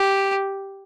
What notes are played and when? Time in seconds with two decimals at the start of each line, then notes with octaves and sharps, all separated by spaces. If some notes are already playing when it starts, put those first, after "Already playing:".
Already playing: G4